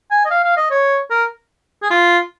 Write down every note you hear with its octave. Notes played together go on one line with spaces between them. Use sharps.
G#5
D#5
F5
F5
D#5
C#5
A#4
G#4
F4